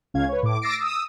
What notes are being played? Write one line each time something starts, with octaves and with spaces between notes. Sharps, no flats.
C#2 C#4 F5 G#6
B4 C#5
A2 D6
D6 E6 A6 A#6 C7 D7
D#6 E6